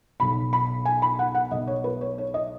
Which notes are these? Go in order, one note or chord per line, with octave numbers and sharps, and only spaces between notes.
B1 B2 B5
B5
G#5
B5
F#5
F#5
B1 B2 D#5
C#5
B4
C#5
C#5
D#5